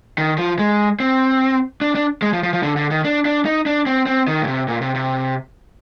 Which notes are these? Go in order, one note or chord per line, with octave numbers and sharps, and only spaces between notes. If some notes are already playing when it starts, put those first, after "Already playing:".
D#3
F3
G#3
C4
D4
D4
G#3
F3
F3
F3
D3
D3
D#3
D4
D4
D#4
D4
C4
C4
D#3
A#2
C3
A#2
C3
C3